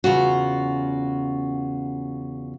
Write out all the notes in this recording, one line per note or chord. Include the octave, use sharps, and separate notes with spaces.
E2 C#3 F4 F#4